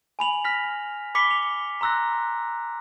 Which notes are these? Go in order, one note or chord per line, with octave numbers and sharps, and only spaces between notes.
G#5 B5 F7 F#7
F6 A#6 B6
B5 D6 B6 C#7 G7
F7
A#5 C6 E6 F#6 A#6